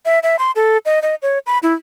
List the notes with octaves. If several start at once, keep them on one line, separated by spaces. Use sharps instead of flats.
E5
E5
C6
A4
D#5
D#5
C#5
B5
E4